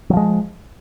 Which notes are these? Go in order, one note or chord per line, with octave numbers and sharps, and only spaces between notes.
F3 F#3 G#3